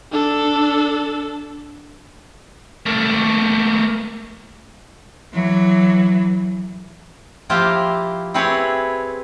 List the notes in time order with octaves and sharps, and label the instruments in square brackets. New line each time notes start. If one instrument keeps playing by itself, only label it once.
[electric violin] D4 A4
[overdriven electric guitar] A3 A#3
[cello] E3 F#3
[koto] F3 A#3 E4 F4 G4 C5
C4 E4 G4 G#4 B4 C#5